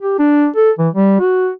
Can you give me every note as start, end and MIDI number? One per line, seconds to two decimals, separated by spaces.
0.01 0.19 67
0.19 0.47 62
0.56 0.71 69
0.79 0.88 52
0.94 1.18 55
1.20 1.50 66